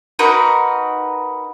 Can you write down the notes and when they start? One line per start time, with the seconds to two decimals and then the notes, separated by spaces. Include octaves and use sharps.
0.19 D#4 F#4 A#4 B4